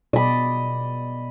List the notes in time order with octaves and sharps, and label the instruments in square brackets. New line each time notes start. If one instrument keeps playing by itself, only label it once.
[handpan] B2 D5 [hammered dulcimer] D#5 B5